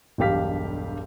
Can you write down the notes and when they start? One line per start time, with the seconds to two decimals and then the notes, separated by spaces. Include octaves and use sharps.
0.18 E1 B1 G2 G4 F5 B6